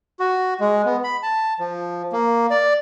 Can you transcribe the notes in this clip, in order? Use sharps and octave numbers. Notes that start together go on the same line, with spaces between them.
F#4
G#3
B3
B5
A5
F3
A#3
D5